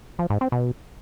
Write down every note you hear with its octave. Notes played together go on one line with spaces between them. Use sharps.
F3
G#2
C4
B2